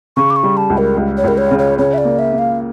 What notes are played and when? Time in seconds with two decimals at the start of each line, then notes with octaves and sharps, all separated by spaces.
0.17 C#3 C#6
0.30 D6
0.36 C#6
0.43 G3
0.57 A5
0.70 C#2
0.77 A#4
0.97 C#2
1.17 C#5
1.24 C#2 A#4
1.38 C#5
1.51 C#3
1.58 C#5
1.78 C#3 C#5
1.94 E5
1.98 D5
2.05 A#3
2.19 E5
2.32 A#3
2.38 F5